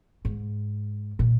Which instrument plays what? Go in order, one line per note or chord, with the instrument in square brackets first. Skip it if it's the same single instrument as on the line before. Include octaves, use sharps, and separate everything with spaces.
[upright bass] G#2
A#2